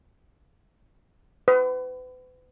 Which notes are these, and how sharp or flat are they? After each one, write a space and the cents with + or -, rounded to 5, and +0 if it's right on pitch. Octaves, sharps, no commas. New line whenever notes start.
B4 +40